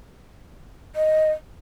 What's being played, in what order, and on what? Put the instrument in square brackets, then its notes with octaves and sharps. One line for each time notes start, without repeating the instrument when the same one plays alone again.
[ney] D#5